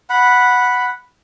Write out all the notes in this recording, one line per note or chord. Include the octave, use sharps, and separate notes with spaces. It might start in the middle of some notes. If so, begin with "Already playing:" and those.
F#5 B5